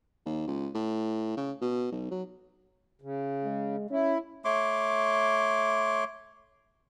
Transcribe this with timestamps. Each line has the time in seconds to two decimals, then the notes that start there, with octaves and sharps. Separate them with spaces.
0.26 D#2
0.47 C#2
0.74 A2
1.37 C#3
1.61 B2
1.92 B1
2.11 F#3
3.02 C#3
3.44 G#3
3.90 C#4 E4
4.45 A3 C#5 C6 D6